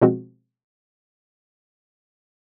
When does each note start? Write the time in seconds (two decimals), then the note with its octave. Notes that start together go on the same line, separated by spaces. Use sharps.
0.02 B2 F3 G#3 C4 F#4